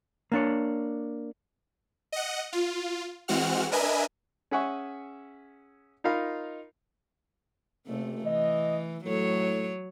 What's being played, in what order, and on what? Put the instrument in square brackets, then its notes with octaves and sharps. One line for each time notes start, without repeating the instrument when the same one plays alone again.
[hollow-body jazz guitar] A#3 D4 C#5
[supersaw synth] D#5 F#5
F4
E3 G#3 C4 F#4 F#5 F6
D4 A#4 B4 D#5 E5 G#5
[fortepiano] C#4 G#4 E5 F#5 G#5 C#6
D#4 F4 A#4 F5 B5
[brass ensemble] F#1 [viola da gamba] C3 A3
[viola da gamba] E3 [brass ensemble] D#5
[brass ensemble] A2 A3 [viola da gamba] F#3 C#5